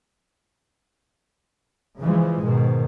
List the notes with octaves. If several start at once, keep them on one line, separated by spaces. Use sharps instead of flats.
C#3 E3 F3 G#3
G#2 B2 D#3